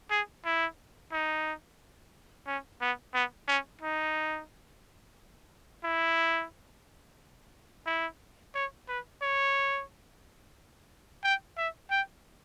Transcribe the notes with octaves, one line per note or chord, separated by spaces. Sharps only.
G#4
E4
D#4
C#4
B3
B3
C#4
D#4
E4
E4
C#5
B4
C#5
G5
E5
G5